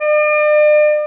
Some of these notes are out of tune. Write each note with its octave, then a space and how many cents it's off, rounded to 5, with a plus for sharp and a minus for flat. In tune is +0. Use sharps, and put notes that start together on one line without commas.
D5 +45